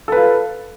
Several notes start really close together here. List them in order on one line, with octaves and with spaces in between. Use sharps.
A4 B4 F4